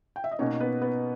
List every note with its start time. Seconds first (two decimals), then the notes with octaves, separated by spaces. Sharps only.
0.16 G5
0.24 E5
0.32 D#5
0.39 B2 A#3 C#4 D#4 C#5
0.60 B3 B4
0.82 B3 B4